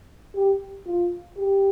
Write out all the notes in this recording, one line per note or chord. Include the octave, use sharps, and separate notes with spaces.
G4
F4
G4